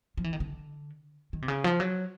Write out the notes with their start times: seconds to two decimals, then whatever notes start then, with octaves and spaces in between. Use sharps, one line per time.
0.17 F3
0.24 E3
0.33 D#3
0.40 D3
1.33 D#3
1.42 C3
1.48 C#3
1.64 F3
1.80 F#3